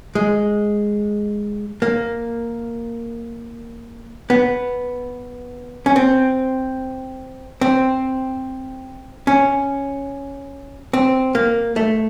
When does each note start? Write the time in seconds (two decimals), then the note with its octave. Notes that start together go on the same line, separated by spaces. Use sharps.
0.15 G#3
1.82 A#3
4.30 B3
5.86 C#4
5.96 C4
7.61 C4
9.27 C#4
10.93 C4
11.35 A#3
11.76 A3